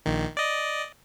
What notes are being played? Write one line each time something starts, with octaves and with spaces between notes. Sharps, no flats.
A#1 D#3
D5 D#5